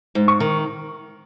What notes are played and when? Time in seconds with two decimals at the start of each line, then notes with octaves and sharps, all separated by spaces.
0.15 G#2
0.28 C#6
0.40 D#3